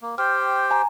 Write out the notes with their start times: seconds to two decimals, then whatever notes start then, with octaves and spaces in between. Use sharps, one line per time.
0.02 A#3
0.18 G4 C5 G5 F6
0.71 G#5 A#5